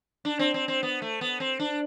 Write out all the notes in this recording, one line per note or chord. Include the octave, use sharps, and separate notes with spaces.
D4
C4
C4
C4
B3
A3
B3
C4
D4